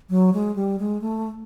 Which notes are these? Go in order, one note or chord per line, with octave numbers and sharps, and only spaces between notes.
F#3
G#3
G3
G#3
A3